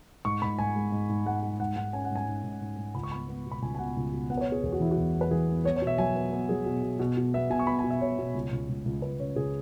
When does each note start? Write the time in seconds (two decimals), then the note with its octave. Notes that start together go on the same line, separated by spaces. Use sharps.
0.25 G#2 C#6
0.42 G#2 B5
0.59 G#2 G#5
0.76 G#3
0.92 G#2
1.09 G#2
1.26 G#3 F#5
1.42 G#3
1.59 G#2 F#5
1.76 G#2 F#5
1.93 C#4 G#5
2.05 F#5
2.10 G#2
2.15 G#5
2.28 G#2
2.44 G#2
2.61 G#2
2.77 G#2
2.94 C#2 B5
3.03 C#6
3.11 B3 B5
3.28 B3
3.46 B2
3.51 B5
3.62 C#2 G#5
3.75 G#5
3.79 B2 F#5
3.97 C#2
4.13 B2
4.30 B3 F#5
4.37 B4
4.41 C#5
4.47 B3
4.52 G#4
4.63 E2 G#4
4.72 F#4
4.80 E3 E4
4.91 F#4
4.97 E2
5.14 B3
5.21 B4
5.31 E3 G#4
5.48 B3
5.64 B3 C#5
5.76 C#5
5.82 B2
5.87 E5
5.98 F#3 G#5
6.15 B3
6.33 B3
6.49 F#3 G#4
6.66 B2
6.82 B2
6.99 B2
7.17 B2
7.34 B3 E5
7.50 B2 G#5
7.59 C#6
7.67 B3 B5
7.79 G#5
7.84 B2
7.90 E5
8.01 B2 C#5
8.18 B2
8.35 C#2
8.52 C#2
8.69 C#2
8.85 C#2
9.02 C#2 B4
9.20 C#3 C#5
9.36 C#2 G#4